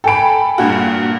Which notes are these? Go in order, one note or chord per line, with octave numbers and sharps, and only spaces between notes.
A4 G5 G#5 B5 D7
G2 A#2 F#4